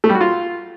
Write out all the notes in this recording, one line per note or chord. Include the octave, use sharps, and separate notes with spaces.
A3
G3
F#4
F4